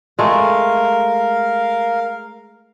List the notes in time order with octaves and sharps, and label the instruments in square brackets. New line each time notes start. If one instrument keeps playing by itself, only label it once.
[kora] G#3 A3 [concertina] A#4 F5